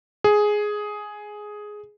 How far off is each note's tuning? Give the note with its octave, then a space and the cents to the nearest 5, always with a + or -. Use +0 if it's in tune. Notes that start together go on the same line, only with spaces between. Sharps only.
G#4 +5